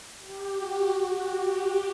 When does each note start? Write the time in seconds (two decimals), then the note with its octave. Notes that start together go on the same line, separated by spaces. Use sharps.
0.19 G4
0.54 F#4
1.23 G4
1.58 G4